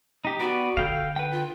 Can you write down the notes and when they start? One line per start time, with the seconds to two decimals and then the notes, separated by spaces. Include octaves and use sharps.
0.25 D#4 G4
0.40 B3 F#4 D5
0.77 D3 A4 F5 G5 G6
1.16 B4 F#5 G5
1.32 F4